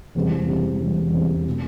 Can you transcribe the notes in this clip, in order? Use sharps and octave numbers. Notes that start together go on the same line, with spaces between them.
E1 E2 C3 E3 G3
E1 E2 C3 E3 G3
E1 E2 C3 E3 G3
E1 E2 C3 E3 G3
B2 A3